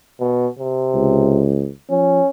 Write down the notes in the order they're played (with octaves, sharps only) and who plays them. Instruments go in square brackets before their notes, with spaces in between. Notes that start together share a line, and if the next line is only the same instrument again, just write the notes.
[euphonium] B2
C3
[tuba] C#2
[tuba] F3 [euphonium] C#4